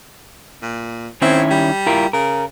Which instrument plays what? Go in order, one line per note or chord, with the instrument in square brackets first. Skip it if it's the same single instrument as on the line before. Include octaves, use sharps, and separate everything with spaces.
[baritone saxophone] A#2
[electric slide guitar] D#3 C#4 E4 [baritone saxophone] C4
[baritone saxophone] G3
[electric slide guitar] E4 F4 A#4
[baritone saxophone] C#3 [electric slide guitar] A#4